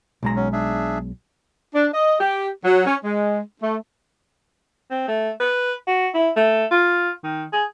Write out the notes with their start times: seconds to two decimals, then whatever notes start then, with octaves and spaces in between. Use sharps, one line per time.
0.23 B1 G#3 A#5
0.36 F#3 C#4
0.53 D4 G#4 E5
1.74 D4
1.93 D#5
2.20 G4
2.65 F#3
2.86 C#4
3.05 G#3
3.62 A3
4.91 C4
5.08 A3
5.40 B4
5.88 F#4
6.15 E4
6.37 A3
6.71 F4
7.24 D#3
7.53 G#4